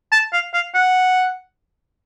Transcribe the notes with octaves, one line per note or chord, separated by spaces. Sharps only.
A5
F5
F5
F#5